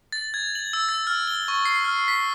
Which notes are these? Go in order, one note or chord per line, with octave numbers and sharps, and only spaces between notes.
A6
G#6
F#7
E6
A6
F6
G7
C#6
C7
F6
B6